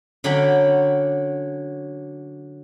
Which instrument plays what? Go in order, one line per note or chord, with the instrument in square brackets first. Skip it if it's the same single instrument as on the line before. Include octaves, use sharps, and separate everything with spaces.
[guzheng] D3 F#3 C#4 D4 G5 B5